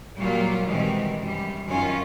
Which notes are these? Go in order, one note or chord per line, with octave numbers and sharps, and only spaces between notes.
A#2 F#3 G3 A#3 F4
B2 D#3 E3 G3 G#3 C4
F#2 G3
F#2 D#3 C#4 F4